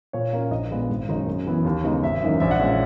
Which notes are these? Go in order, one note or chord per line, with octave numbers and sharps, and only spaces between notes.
A#2 C#5
A#3 C#4
A#1 D#5
A#2 G#3 B3
G#1
F#2 D#3 G#3 D#4
F#2
E3 B3 E4
D#2
C#3 G#3 B3 D#4
G#1 E5
F#2 E3 A#3 D#4
A#1 E5
F#5
A#2 G#3 C#4 E5